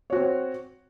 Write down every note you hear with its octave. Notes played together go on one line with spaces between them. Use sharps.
C4 F#4 C#5